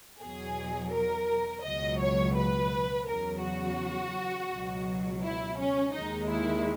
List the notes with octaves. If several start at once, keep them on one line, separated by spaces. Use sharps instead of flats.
E2 B2 F#3 G#4
A#4
C#2 B2 F#3 D#5
C#5
B4
E2 C#3 F#3 A#4
F#4
C#2 B2 F#3
E4
C#4
D#2 D#3 G#3 D#4
E4